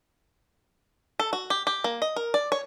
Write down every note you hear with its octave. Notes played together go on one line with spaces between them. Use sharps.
A4
F#4
G4
G4
A#3
D#5
A#4
D5
C#5